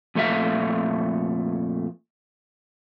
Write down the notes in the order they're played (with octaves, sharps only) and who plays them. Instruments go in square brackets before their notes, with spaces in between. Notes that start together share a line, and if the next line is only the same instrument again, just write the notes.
[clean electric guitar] F2 A#2 A3 C#4 E5 F5